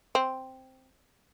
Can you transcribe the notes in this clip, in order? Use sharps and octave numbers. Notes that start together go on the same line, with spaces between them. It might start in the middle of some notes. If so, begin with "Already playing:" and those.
C4